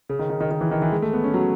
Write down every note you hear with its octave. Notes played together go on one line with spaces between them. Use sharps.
C#3
D#3
D#3
D#3
D#3
E3
D#3
E3
G#3
A3
B3
C#4
F#3